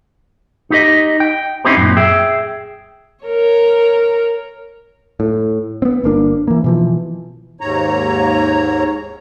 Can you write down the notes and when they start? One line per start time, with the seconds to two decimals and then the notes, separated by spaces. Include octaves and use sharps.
0.70 D#4 G4 D#5
1.20 G5
1.65 C4 C#4 D#4 E4 G4 C5
1.77 F#2 A#2
1.97 G#4 E5 G5
3.24 A#4 C#5
5.20 A2
5.82 B3 C4
6.04 G1 A#3 D4
6.48 E3 A#3
6.64 B2 E3 F3
7.61 D#2 G#2 C#5 A#5